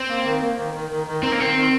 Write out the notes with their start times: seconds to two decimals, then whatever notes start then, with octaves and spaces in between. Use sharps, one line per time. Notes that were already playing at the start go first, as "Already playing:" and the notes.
Already playing: C4
0.09 A#3
0.25 D#3
0.41 A#3
0.58 D#3
0.74 D#3
0.90 D#3
1.07 D#3
1.23 C4 D#4
1.32 A#3
1.40 D#3 C4
1.56 D#3